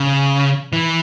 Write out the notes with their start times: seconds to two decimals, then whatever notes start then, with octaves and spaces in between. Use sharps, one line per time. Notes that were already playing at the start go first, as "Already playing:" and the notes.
Already playing: C#3
0.73 E3